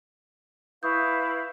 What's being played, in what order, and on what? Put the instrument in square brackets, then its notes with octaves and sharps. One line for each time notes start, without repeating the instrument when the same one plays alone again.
[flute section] E4 B4 F5 [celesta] C#6 D#6 G6